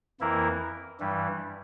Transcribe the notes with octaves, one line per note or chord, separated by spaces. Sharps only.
F2 E3 A#3 E4 A#4
G2 E3 G3